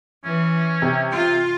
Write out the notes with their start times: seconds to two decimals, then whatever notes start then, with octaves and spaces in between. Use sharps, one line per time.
0.25 E3 C#4
0.82 C3
1.12 F4